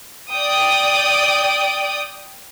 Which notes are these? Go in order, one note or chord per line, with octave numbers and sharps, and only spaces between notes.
D5 G5 D#6